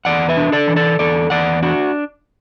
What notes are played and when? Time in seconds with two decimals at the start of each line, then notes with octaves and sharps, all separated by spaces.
0.05 E2 D5 F#5
0.29 B4 E5
0.37 D4
0.52 A4 D5
0.68 E3
0.76 A4 D5
0.99 E2 A4 D5
1.30 E2 D5 F#5
1.62 D4 F#4